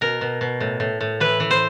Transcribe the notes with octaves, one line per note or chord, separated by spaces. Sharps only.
B2 A#4
B2
B2
A2
A2
A2
E3 B4
E3
C5